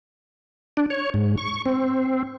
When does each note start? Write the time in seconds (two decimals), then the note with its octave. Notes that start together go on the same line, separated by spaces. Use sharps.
0.77 D4
0.90 C#5
1.14 G#2
1.38 C#6
1.66 C4